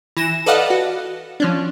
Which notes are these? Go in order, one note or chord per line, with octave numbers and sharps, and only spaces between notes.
E3 A#6 E7
A4 B4 D5 D#5 F5 F#5
F#4
F3 C#4 D4